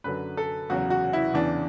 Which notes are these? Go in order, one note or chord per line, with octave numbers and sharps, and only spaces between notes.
F#2 D3 F#3 B4
A4
E2 C#3 F#3 F#4
F#4
E4
E2 C#3 E3 D4